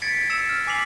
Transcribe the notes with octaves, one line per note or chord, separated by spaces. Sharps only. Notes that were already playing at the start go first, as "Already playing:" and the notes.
G#6 A6 B6 C#7 D7
D7
E6 A6 C#7 E7 F7
F6
G#5 D6 B6 C7 F7 F#7